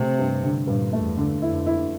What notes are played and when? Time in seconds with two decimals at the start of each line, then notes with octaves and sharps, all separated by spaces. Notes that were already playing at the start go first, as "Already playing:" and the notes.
Already playing: C3 A3
0.19 G2
0.43 D3
0.67 G2 A#2
0.93 A3
1.04 E2
1.18 D3
1.42 F2 E4
1.66 E4